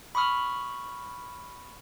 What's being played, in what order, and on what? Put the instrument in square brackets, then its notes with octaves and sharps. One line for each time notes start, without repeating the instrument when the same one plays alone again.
[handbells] B5 C#6 D#6 F6